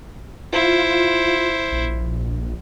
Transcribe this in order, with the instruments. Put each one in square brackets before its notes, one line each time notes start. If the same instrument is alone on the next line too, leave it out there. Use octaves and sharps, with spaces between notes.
[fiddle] E4 C5 [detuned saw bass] F4
[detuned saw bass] A#1